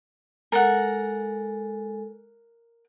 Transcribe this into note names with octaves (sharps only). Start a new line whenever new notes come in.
G#3 A4 A#4 F#5